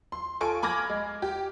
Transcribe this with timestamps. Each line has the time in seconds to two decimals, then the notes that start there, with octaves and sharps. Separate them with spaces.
0.12 C6
0.40 F4 A4 G#5 C#6 D7
0.63 G#5 B5 D6 F6 G#6 A#6
0.90 G#3
1.22 G4